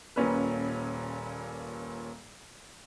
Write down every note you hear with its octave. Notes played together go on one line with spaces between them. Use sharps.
D#1 A#2 C#4 B4